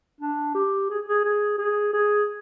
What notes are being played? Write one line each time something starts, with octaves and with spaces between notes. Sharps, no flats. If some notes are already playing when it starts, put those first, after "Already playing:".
D4
G4
G#4
G#4
G#4
G#4
G#4